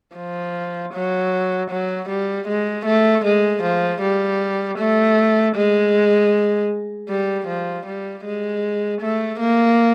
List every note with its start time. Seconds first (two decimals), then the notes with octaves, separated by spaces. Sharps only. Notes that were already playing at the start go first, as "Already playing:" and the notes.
0.16 F3
0.94 F#3
1.71 F#3
2.09 G3
2.48 G#3
2.86 A3
3.25 G#3
3.63 F3
4.02 G3
4.79 A3
5.56 G#3
7.10 G3
7.48 F3
7.86 G3
8.25 G#3
9.02 A3
9.40 A#3